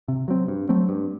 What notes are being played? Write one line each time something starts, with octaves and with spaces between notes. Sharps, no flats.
C3
F#3 C4
G2
F#3 A3 C4
G2